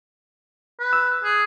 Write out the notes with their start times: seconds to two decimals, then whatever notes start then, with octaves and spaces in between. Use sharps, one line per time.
0.79 B4
0.93 E6
1.23 G#4